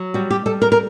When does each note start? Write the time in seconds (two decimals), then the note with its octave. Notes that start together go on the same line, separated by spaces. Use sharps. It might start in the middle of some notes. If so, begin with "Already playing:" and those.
Already playing: F#3
0.14 G3 F#4
0.31 G4
0.46 G3 A4
0.62 A#4
0.72 A#4